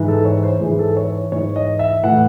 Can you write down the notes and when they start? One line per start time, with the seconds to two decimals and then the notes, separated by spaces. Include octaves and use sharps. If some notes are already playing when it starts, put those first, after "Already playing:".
Already playing: G#2 E3
0.08 A4
0.25 C#5
0.43 C5
0.61 G#2 E3 G#4
0.79 A4
0.97 C#5
1.32 G#2 E3 C#5
1.56 D#5
1.79 E5
2.03 A2 E3 F#5